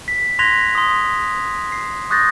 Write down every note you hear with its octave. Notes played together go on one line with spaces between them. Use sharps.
B6
C6 F#6 G#6 A#6 B6 F7
C6 D#6
C7
C#6 D#6 F#6 G6 A6 A#6